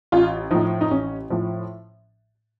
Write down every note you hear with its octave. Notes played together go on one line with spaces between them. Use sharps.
A1 F4
A2 F3 D#4
D#4
A1 C#4
A2 F3